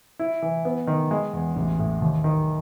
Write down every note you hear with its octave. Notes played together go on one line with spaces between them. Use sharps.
E4
E3
B3
D#3
G#3
E2
A1
A2
D#2
D#3